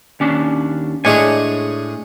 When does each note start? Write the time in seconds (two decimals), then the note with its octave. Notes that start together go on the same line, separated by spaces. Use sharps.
0.20 D#2 C#4 D4
1.05 A2 G#3 D4 G#4 C#5 G#5